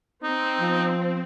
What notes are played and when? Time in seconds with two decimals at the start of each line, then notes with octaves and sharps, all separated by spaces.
0.23 C4 D#4
0.60 F3